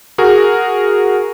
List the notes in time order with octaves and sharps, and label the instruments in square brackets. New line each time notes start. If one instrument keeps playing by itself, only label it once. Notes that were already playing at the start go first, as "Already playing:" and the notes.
[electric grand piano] F#4 G#4 A#4